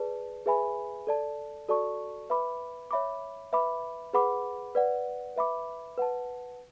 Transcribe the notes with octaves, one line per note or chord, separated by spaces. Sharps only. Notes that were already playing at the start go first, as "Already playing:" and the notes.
Already playing: G#4 B4 D5 A5
G#4 B4 E5 G#5 B5
A4 D5 A5
F#4 A4 D5 A5 C#6
B4 E5 B5 D6
C#5 E5 B5 D6
B4 E5 B5 D6
G#4 B4 F#5 B5 D6
B4 D5 F#5
B4 E5 B5 D6
B4 F#5 A5